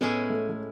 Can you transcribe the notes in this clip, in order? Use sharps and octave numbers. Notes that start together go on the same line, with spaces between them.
A2 G#3 B3 C#4 E4 G#4
A3
A3